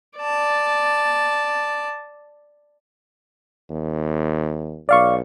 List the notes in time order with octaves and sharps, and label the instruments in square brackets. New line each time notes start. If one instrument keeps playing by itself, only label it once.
[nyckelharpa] D5 A5
[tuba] D#2
[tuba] B1 [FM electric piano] D5 F5 C#6